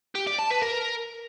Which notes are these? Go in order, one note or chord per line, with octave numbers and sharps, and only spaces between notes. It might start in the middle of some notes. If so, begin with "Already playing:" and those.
G4
D5
A5
B4
A#4